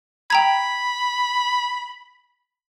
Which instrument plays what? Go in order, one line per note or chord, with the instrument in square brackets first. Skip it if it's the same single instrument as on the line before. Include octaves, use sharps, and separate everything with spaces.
[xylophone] G5 A#5 G#6 [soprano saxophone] B5